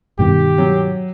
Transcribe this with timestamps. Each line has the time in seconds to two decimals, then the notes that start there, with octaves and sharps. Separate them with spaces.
0.19 G2 B2 D#3 G4
0.58 F#3